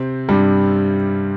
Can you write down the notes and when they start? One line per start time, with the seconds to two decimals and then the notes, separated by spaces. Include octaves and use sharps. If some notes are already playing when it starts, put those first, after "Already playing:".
Already playing: C3 C4
0.29 G2 G3